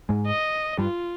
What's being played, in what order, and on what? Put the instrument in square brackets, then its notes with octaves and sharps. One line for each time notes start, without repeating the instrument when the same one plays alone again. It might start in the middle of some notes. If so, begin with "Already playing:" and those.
[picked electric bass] G#2 G#3
[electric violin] D#5
[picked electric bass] G2 G3 [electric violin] F4